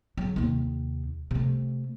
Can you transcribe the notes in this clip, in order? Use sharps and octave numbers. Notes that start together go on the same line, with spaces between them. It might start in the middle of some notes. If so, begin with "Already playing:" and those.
C#3 F#3
D#2 C3
C3 A3